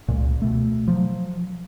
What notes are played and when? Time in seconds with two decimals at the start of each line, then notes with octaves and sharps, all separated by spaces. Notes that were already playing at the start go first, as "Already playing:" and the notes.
0.08 C#2 A#2
0.42 B2 A3
0.88 F3 F#3